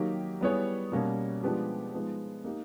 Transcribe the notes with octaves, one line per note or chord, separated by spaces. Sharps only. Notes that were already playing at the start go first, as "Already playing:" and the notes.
Already playing: D#3 F#3 A#3 D#4 G4
G3 B3 E4 G#4 C#5
B2 G3 A#3 C#4
F3 G#3 B3 D4 G4
F3 G#3 B3 D#4
A#3 D#4 G4